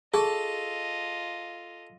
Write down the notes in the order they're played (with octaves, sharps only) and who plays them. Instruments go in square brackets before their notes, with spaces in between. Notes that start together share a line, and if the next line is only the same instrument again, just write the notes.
[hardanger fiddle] F4 D#5 [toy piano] G#4 C#6 [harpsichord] A4